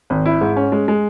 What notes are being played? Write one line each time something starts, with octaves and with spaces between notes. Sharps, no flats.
G#1
E4
G#2
C#4
G#3
G#3